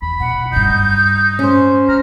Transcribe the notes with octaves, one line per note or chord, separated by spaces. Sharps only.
E2 B5
B2 F#5
G2 D#4 E4 G6
C#4 C5
G2 A#5 F6